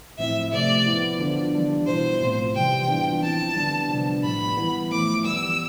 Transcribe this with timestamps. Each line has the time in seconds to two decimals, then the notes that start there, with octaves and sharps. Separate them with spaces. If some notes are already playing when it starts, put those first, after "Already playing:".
0.18 A2 F3 C4 E4 E5
0.52 C3 F3 A3 D5
0.86 F3 B3 E4
1.19 D3 F3 B3 D4 F4
1.54 E3 G3 D4 F4
1.87 B2 B3 E4 C5
2.21 A2 F3 C4 F4
2.55 C3 E3 G3 G5
2.88 E3 B3 D4 F4
3.22 F3 C4 E4 A5
3.55 D3 G3 B3 D4
3.89 C3 F3 B3 D4
4.23 A2 G3 B3 B5
4.57 E3 B3 E4
4.91 F3 A3 E4 D6
5.24 E3 G3 B3 E6